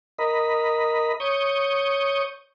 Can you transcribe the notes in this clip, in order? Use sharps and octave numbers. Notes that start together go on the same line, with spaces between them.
A#4 D#5 B5
C#5 C#6 D#6 G6